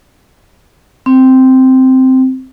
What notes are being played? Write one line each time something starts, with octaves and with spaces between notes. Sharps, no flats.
C4